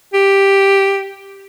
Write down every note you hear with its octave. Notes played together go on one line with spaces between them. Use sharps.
G4